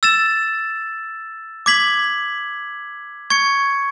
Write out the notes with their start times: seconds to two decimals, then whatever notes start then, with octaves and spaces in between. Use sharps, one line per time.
0.03 E6 A6 E7
1.66 D6 G#6 B6 F#7
3.30 C#6 G#6 C#7